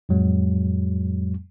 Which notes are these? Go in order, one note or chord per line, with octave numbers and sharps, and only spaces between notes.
F2 A2 F#3 G#3